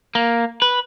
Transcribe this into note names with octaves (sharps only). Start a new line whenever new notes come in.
A#3
B4